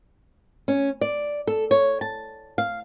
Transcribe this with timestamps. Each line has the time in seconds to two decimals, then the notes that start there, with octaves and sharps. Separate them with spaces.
0.68 C#4
1.01 D5
1.47 A4
1.71 C#5
2.01 A5
2.58 F5